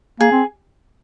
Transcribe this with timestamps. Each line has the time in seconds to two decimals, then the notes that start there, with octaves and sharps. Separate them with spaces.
0.20 A#3 G#4
0.32 C4